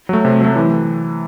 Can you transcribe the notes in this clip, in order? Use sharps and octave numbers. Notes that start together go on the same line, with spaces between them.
F#3 A3
C3
F#3 A3
E3